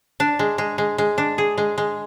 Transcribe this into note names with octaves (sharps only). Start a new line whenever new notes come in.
D4
G#3
G#3
G#3
G#3
D4
G#4
G#3
G#3